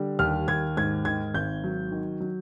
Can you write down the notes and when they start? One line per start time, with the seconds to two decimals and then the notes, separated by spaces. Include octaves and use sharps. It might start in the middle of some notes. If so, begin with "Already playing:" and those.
Already playing: D3 G3
0.19 D#2 F6
0.48 D#2 G#6
0.77 G#2 G#6
1.05 D#3 G#6
1.34 G#1 G6
1.64 F#3
1.92 D#3
2.20 F#3